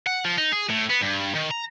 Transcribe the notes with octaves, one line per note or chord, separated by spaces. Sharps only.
F#5
F3
D#4
G#4
A2
B3
G2
D#3
A#5